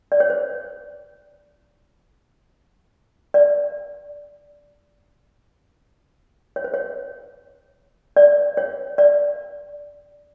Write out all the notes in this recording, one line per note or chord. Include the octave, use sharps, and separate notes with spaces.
D5
C#5
C5
C#5
D5
C#5
C5
C#5
D5
C#5
D5